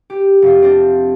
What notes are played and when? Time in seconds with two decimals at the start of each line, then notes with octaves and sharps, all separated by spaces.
0.10 G4
0.42 F1 F4
0.62 C4 D4